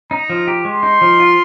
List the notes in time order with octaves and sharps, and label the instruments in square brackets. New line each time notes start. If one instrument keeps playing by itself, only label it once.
[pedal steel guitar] D#4 [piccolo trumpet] A#5
[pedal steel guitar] F3
G4
[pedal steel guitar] G#3 [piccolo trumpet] C6
[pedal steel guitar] D#4
F3
F4